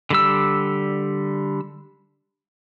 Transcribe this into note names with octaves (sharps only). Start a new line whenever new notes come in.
D3 G3 E6